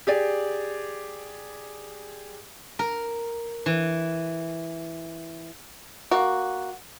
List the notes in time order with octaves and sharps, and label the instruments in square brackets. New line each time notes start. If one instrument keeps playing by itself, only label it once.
[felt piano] G4 G#4 D5
[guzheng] A#4
E3
[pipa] A#3 F#4